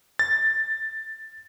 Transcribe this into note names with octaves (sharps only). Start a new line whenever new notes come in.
A6